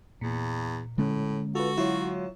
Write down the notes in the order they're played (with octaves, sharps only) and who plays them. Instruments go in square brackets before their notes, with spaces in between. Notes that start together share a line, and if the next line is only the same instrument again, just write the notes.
[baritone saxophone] E2 [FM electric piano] A#2
[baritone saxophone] A2 [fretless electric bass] D3 G#3 C#4
[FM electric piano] F4 B4 [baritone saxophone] F#4 [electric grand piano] A4
[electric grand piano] F#3 F4 [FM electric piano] E4 C#5